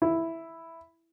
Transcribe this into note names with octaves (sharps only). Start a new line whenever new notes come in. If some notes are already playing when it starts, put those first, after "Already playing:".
E4